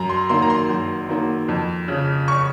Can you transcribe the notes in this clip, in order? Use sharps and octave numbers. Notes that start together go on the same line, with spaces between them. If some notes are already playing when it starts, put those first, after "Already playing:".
Already playing: F#2 A#5
C6
D#3 F#3 A#3 C6
A#5
C6
F#2
D#3 F#3 A#3
F2
C#3 F3
C#6